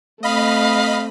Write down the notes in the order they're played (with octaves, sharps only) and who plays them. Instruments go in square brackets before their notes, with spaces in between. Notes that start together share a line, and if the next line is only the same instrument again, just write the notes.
[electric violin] A3 C4 [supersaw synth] D#5 B5 [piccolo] F5